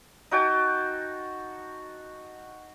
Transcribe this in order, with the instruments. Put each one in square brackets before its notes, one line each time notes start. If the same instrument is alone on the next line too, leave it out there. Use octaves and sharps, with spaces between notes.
[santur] D#4 F#4 G5 A5